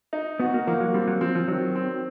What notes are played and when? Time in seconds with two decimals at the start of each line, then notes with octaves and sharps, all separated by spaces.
0.13 D#4
0.40 B3 F#4
0.54 A#3
0.67 F3 A#3
0.80 F#3
0.94 G3 C4
1.08 F#3
1.21 F3 C4
1.35 F3
1.48 D#3 F#3
1.75 C4